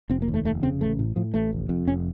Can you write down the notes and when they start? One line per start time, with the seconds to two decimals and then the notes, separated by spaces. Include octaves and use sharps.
0.10 F1 C4
0.22 A#3
0.28 D#2
0.34 A3
0.45 F1 A3
0.63 C#3 C4
0.81 A1 A3
0.99 A2
1.16 A2 F3
1.34 A1 A3
1.53 F1
1.69 F2
1.88 F1 C#4